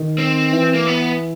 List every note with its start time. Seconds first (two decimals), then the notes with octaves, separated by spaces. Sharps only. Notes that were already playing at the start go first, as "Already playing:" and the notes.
Already playing: D#3
0.18 C4
0.53 E3
0.74 A#3
0.87 B3